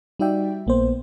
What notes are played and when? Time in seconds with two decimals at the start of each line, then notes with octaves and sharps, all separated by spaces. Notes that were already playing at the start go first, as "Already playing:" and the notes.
0.19 G3 D#4 F#4 D5 E5 G5
0.67 A#1 A#3 B3 C5